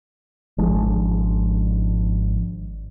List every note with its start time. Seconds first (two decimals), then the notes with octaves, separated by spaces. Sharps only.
0.58 G#1 F3 G#3 D4